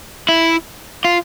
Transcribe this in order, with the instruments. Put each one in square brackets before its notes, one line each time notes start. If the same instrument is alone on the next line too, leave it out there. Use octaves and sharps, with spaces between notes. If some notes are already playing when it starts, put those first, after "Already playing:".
[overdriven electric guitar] E4
F4